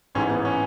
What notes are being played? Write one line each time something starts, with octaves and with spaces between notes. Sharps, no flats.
A1 G#2 E3 C#4
B3
C#4